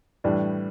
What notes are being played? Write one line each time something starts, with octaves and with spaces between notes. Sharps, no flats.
A2 E3 G3 D4